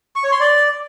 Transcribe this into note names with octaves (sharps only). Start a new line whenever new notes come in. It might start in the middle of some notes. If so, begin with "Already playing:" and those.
C#6
C#5
C6
D5